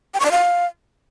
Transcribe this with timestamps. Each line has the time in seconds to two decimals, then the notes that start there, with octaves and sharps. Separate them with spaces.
0.14 G5
0.20 C#6
0.26 D5
0.31 F5